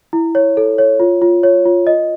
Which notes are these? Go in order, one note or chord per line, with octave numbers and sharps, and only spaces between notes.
E4
C#5
A4
C#5
F4
F4
C#5
F4
D#5